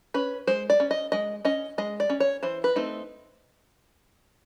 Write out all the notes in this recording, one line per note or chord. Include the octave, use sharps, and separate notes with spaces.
C#4 B4
G#3 C5
D5
C#4
D#5
G#3 D#5
C#4 D#5
G#3 D#5
D5
C#4
C#5
E3 C5
B4
A3 C4 D#4